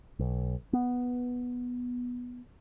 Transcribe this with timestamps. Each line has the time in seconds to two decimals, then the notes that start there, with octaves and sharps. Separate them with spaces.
0.19 B1
0.73 B3